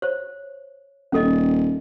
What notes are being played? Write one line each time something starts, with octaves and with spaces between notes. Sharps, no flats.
C5 C#5
D#1 C#4 A4 D#5